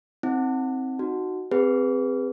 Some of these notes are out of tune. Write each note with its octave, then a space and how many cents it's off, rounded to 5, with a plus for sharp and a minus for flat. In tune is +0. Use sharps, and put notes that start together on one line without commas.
C4 +5 D#4 +45
D#4 +0 F#4 +0
C4 -5 G#4 -35 B4 +0